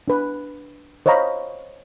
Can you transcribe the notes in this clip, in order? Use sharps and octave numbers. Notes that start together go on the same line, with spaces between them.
D4 B4
C5 C#5 D#5 F5 A#5 B5